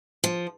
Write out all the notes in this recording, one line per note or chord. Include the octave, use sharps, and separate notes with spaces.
F3